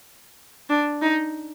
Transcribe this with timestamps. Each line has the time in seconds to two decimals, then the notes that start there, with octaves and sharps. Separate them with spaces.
0.70 D4
1.02 D#4